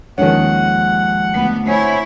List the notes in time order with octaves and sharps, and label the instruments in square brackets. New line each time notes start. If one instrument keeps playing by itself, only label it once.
[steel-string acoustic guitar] D#2 F3 G#3 [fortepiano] D#3 C#4 [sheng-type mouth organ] F#5
[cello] D2 B3
[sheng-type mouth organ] C4 C#5 G#5 [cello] E4 [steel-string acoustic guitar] F#5